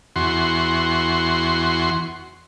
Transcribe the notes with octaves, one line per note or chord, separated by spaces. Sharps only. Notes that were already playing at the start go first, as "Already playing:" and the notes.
E2 F#4 C6